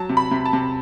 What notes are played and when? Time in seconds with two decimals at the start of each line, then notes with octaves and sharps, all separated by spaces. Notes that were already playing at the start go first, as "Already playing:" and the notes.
Already playing: F#3 A5
0.09 C3
0.17 B5
0.31 C3
0.45 A5
0.53 C3